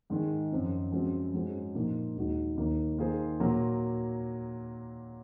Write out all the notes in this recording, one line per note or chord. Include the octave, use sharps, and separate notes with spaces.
G#2 D#3 G#3
F#2 F3 C4
F#2 F3 G#3 C4 F#4
G#2 F#3 C#4 G#4 C5
A#2 F3 A#3 D#4
D#2 D#3 G#3 D#4 F#4
D#2 D#3 A#3
D#3 A#3 F4 G#4 C5
A#2 F#3 A#3